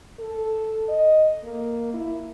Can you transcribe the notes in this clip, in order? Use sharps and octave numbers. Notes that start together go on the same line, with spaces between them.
A4
D#5
A#3
E4